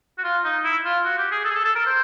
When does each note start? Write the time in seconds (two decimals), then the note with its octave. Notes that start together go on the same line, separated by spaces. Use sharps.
0.18 F#4
0.23 F4
0.44 D#4
0.64 E4
0.84 F4
1.05 F#4
1.18 G4
1.31 G#4
1.44 A4
1.50 G#4
1.54 A4
1.64 A4
1.75 A#4
1.86 C5